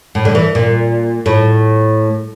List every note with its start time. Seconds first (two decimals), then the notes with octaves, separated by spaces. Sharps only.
0.15 A2
0.25 D3
0.35 E3
0.55 A#2
1.26 A2